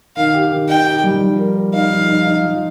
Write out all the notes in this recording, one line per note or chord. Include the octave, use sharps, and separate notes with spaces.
D#3 F5
G4
D#3
D#4 G5
G4
G3
F3
A#4
A#4
D#4 F5
F3
D#4
D#4
F3